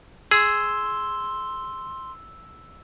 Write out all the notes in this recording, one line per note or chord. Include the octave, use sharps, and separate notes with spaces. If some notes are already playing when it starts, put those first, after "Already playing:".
G#4 C6 E6 E7